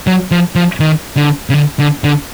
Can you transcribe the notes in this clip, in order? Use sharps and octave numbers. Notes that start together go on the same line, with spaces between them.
F#3
F3
F3
D#3
D3
C#3
D3
D3
D3